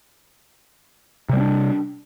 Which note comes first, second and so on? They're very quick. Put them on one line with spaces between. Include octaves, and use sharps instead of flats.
C3 G3 C4 D4